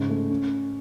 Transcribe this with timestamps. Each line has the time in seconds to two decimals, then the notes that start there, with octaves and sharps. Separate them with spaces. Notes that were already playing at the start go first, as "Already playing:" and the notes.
Already playing: G#2 C#3
0.10 A3
0.30 C#4